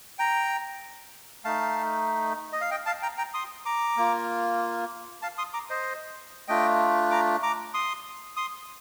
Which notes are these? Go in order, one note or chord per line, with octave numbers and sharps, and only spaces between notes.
G5 A#5
A3 D#4 F5 A5
D#5
F5
D#5 G5
F5 A5
G5 A#5
G5 A#5
C6 D#6
A#5 D6
A#3 F4
F5 A5
C6 D#6
A#5 D6
C5 D#5
A3 D4 F4 D#5 G5
A#5 D6
A#5 D6
C6 D#6
C6 D#6